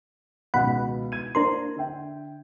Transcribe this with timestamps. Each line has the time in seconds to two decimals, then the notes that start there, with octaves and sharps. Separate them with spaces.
0.54 C#2 B2 D#3 F#5 B5
1.12 G#6 D#7
1.35 A#3 D4 A#4 C5 C6
1.76 D3 E5 G5